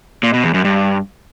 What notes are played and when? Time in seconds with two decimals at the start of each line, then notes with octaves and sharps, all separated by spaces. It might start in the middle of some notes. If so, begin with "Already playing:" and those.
0.23 A#2
0.33 B2
0.44 E2
0.54 F#2
0.65 G2